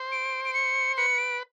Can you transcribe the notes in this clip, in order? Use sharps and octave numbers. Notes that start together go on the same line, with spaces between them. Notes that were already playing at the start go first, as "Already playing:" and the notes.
Already playing: C5
D7
D7
C#7
B4 C#7
D7